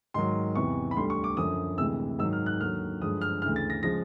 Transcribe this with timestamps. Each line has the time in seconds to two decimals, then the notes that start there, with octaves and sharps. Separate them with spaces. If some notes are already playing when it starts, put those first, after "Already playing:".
0.14 G#2 D#3 F#3 C6
0.55 E2 C3 E3 C#6
0.91 B5
0.97 D2 D3 G3 C6
1.10 C#6
1.24 D6
1.37 F#2 D3 F3 D#6
1.78 D2 C3 E3 G#3 E6
2.19 G#2 D#3 F#3 E6
2.33 F6
2.46 F#6
2.61 D#2 D3 F#3 F6
3.01 G2 D3 F3 G#3 D#6
3.21 F6
3.42 E3 F6
3.45 D2 C#3
3.56 A6
3.70 A#6
3.83 C#3 F3 G#3 A#6